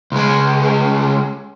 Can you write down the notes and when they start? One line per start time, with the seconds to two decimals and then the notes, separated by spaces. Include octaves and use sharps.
0.12 C#2 G#3